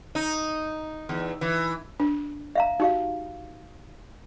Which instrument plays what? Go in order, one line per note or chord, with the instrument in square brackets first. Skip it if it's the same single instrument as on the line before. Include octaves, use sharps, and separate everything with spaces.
[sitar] D#4
E2
E3
[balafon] D4
[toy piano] E5 F5 A#5
[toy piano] D#4 G4 F5 [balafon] F#4